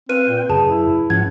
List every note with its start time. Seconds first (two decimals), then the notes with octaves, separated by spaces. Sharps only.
0.09 C4 B4 F5 D#7
0.27 A#2 G5
0.49 F#2 C#3 G#4 A5
0.67 E4
1.10 G#2 F3 C#4 F#5 G#6